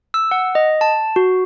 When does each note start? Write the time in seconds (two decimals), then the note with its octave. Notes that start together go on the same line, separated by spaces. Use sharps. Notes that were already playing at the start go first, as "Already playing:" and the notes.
0.14 E6
0.31 F#5
0.55 D#5
0.81 A5
1.16 F#4